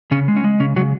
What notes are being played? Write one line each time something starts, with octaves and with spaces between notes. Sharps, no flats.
C#3 C#4
G#3
C#4
G#3
C#3 C#4
C#3 F#3 F#4